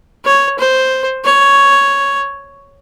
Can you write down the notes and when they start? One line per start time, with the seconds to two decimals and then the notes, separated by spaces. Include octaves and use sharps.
0.25 C#5
0.58 C5
1.24 C#5